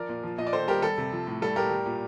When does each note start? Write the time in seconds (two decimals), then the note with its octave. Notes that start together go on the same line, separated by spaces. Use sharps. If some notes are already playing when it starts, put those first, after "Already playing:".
Already playing: F3 A#4 D5
0.09 A#2
0.23 F3
0.38 A#2 D#5
0.47 D5
0.53 D#3 A4 C5
0.68 G3 G4 A#4
0.82 G3 A4
0.98 C3
1.12 F3
1.27 A2
1.42 G3 A4
1.56 A2 G4 A#4
1.71 G3
1.86 A#2